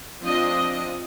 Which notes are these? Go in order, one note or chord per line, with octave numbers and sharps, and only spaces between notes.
F3 C4 D4 D#5